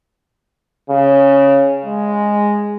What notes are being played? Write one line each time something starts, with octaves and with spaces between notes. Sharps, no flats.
C#3
G#3